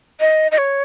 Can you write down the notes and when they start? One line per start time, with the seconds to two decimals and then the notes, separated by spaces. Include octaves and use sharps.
0.20 D#5
0.52 D#5
0.58 C#5